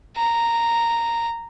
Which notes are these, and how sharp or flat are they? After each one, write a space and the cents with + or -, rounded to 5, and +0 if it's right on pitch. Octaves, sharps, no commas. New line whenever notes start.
A#5 -5